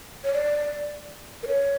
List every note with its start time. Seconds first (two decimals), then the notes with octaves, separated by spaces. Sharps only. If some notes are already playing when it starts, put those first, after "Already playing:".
0.24 C#5
0.33 D5
1.43 A#4
1.47 C#5